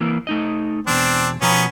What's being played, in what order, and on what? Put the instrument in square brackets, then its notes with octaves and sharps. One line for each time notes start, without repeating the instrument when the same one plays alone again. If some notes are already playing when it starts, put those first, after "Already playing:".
[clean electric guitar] E3 A#3 E4
A3 D#4 D#5
[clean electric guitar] E2 B2 [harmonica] C4 D4
[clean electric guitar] B2 F3 A#5 [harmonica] B3 C#4